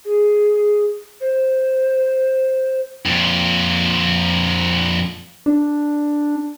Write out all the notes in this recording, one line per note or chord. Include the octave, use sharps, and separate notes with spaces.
G#4
C5
F2 A#2
D4